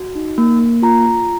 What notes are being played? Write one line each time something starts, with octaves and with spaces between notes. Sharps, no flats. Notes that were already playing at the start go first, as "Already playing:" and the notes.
Already playing: F#4
D#4
A#3
A#3
F4 A#5
F4